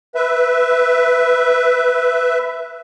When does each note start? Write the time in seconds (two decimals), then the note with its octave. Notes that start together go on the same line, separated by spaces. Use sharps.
0.15 B4 E5